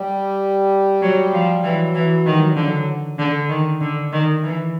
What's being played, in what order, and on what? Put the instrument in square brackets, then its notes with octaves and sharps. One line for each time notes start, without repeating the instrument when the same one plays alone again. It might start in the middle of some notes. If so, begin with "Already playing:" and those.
Already playing: [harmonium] G3
[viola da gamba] F#3
F3
[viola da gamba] E3 [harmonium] F#3
[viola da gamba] E3
[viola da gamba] D#3 [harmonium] G3
[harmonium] F#3
F3
[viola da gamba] D3
[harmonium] F#3
[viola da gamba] D3
D#3
D3
D#3
E3